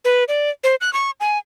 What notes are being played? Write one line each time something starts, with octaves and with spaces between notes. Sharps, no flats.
B4
D5
C5
F#6
C#6
G#5